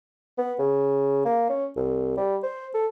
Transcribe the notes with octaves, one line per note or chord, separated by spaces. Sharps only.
B3
C#3
A#3
C#4
C2
G3
C5
A4